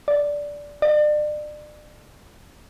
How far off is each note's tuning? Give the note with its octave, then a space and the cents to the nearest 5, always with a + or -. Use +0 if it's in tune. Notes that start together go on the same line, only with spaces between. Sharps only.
D5 -10
D5 +35